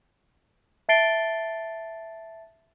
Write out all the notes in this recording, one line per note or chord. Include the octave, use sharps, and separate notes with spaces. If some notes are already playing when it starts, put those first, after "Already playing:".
E5 A5 A6 C7 D7 G7